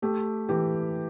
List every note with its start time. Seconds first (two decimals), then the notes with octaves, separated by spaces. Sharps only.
0.02 A3 G4
0.49 E3 G4